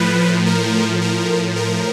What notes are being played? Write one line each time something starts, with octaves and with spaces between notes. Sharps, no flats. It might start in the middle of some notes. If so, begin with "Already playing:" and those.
Already playing: A2 F3 B4
A#4
A2 F3 A#4
A#4